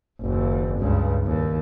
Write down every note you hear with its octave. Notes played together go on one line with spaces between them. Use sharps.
F#1 D#2
C#2 G2
D#2